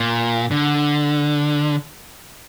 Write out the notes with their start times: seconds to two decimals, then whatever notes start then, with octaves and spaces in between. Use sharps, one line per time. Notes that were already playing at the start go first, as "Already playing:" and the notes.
Already playing: A#2
0.51 D3